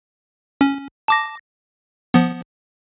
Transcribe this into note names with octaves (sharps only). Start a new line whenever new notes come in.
C#4
A5 D6 A#6
F3 B3